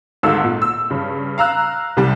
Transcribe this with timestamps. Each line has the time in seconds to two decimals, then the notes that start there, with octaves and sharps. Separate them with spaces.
0.23 G#1 D2 G#2 A4 F5 E6
0.44 A#2
0.62 E6
0.90 G2 C#3
1.38 F5 A#5 E6 F#6
1.97 C2 C3 G3